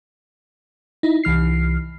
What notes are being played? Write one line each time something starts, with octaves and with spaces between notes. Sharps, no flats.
D#4 E4
C2 E3 F6 C7